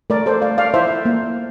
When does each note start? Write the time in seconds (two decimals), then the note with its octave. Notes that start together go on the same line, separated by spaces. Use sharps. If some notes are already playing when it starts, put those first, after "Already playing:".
0.10 A3 A#4 D5
0.26 A4 C5
0.42 A3 D5 F5
0.58 D5 F5
0.74 E4 C5 E5
1.05 A#3